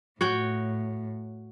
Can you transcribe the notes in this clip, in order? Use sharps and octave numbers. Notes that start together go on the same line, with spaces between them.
A2 F#4 C#5 G5